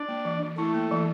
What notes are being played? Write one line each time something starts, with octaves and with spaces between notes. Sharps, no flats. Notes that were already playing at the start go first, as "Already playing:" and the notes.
Already playing: D4 D5
A#3
E3
E3
A3 E4 A4
A#3
E3